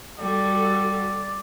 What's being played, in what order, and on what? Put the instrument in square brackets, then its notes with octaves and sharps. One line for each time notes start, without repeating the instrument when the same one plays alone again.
[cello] G3 [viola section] F#4 A4 [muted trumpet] D5